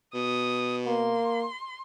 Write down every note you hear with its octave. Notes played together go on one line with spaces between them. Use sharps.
B2 D#6
A#3 C6